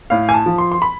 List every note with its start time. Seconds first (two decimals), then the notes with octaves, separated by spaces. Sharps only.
0.10 A2 F5
0.29 G#5
0.34 A5
0.46 F3
0.58 C6
0.72 C6
0.82 B5